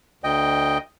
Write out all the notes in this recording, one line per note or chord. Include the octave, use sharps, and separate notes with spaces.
D2 D#5 G5